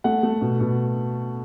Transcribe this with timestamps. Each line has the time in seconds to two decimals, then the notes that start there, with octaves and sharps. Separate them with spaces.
0.04 A3 F#5
0.23 A3
0.41 B2
0.60 B2